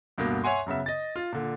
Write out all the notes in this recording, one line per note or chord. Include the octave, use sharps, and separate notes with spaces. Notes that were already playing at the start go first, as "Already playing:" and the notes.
D2 G2 B2 A#3
C#5 E5 F#5 G#5 C6
F#2 C#3 B3 E5
D#5 A6
F4
A#2 D3